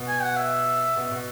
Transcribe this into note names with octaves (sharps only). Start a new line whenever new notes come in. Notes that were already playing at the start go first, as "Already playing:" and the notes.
Already playing: B2
G#5
F#5
E5
B2
B2